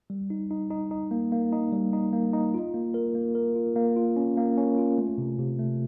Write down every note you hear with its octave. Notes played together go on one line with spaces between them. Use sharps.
G3
D#4
D#4
D#4
D#4
A#3
A#3
D#4
G3
D#4
A#3
D#4
F4
A#3
A#4
A#3
A#4
F4
A#3
F4
C#4
A#3
C#4
F4
A3
C3
C3
A3